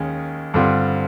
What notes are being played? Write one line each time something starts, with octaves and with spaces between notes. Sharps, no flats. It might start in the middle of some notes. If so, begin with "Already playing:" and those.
Already playing: D#2 D#3 G#3 C#4
G2 D3 G3 C4 F4